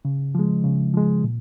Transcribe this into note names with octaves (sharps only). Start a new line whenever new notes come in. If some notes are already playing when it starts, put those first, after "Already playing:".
C#3
F3 G#3
C#3
F3 G#3
A#2